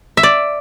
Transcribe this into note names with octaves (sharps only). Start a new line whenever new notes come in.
E5
D5